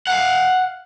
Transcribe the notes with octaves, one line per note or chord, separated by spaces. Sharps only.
F5 F#5